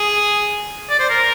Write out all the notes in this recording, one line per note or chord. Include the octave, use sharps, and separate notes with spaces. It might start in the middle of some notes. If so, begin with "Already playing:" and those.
Already playing: G#4
D5
C5
A#4